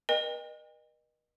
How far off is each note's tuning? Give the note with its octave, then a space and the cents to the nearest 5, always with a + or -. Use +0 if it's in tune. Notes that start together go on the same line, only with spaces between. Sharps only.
A#4 +45 D#5 -30 G5 +40